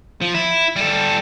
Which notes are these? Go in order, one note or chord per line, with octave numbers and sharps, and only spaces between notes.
F3
E4
G3 A4